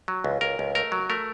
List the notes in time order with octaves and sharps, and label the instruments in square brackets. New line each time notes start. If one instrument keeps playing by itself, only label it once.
[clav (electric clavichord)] F#3
C#2
C#2 A#4
C#2
A3 A#4
F#3
A3 A#4